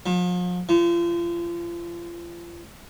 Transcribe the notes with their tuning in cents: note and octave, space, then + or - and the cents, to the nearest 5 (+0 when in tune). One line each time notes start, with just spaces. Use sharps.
F3 +40
F3 -35